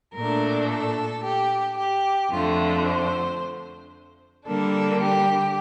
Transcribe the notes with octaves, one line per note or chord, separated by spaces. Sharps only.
A#2 A3 D4 A#4
A4
G4
G4
F2 D3 A3 F4
C5
D3 G3 A#3 D4 A4
G4